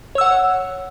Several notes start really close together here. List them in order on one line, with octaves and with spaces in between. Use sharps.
C#5 E6 F#5